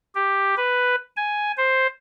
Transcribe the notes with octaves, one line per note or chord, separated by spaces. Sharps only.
G4
B4
G#5
C5